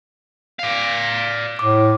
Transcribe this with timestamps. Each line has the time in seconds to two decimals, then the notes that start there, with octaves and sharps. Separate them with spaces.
0.59 D5 F5
1.59 A2 D6